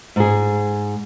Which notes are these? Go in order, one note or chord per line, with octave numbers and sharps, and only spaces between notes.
G#2 G#4